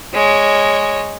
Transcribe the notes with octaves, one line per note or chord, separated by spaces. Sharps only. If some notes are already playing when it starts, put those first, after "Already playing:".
G#3 C#5